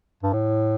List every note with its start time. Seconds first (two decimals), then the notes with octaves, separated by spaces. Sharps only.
0.23 G2
0.33 A2